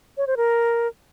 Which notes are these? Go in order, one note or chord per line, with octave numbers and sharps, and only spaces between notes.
C#5
C5
A#4